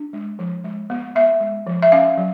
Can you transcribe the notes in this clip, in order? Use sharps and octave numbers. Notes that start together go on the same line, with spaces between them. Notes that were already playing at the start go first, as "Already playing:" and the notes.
Already playing: D4
G#3
F3
G#3
B3
B3 E5
G#3
F3
E5
C#4 F5
F#3